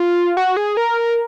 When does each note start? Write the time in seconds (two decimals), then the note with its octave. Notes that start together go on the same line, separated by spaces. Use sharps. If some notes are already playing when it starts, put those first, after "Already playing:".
Already playing: F4
0.37 F#4
0.57 G#4
0.77 A#4